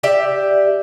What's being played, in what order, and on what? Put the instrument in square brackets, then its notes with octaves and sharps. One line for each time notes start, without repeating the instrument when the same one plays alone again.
[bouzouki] G4 D5 E5